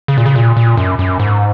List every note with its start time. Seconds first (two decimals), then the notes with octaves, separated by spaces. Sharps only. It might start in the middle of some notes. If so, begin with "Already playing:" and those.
0.08 C#3
0.18 A#2
0.26 C#3
0.36 A#2
0.57 A#2
0.77 F#2
0.99 F#2
1.20 G#2